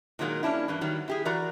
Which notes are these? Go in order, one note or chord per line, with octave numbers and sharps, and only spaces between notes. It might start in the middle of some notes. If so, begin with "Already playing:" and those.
A#2 D#3 F#3 G#3 A#3
A#3 C#4 D4 E4
G2 E3 A#3
D#3 F#3 G3
E4 G4 G#4
E3 F#4 A#4 D5 A#5